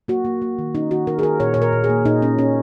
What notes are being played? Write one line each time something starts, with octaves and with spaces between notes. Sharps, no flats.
A#3 F#4
A#3
A#3
D#3
C#4 D#4
D#3 F#4
D#3 A#4
G#4
D#3 A#4
A#2 C#5
A#2 C#5
A#4
A#2
G#4
A#3
A#2 D#4
C#4
C#4